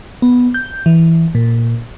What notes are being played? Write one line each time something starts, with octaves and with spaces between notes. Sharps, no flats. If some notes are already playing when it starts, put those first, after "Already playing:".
B3
G6
E3
A#2